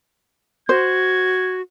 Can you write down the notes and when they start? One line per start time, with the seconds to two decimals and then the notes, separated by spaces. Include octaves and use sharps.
0.69 F#4 C5 G#6